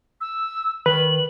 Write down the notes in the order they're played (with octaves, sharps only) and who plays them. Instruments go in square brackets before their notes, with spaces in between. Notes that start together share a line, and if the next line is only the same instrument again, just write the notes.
[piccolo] E6
[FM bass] D#3 [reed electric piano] B4 [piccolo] F#7